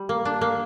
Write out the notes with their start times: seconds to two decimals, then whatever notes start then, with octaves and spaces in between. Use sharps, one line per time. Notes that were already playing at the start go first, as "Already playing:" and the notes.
Already playing: G3
0.09 A#3
0.25 D4
0.41 A#3